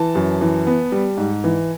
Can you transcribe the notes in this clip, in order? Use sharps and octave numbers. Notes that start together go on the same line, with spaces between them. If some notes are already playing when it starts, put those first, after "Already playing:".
Already playing: E3 A5
F#2
E3
B3
G3
G#2
E3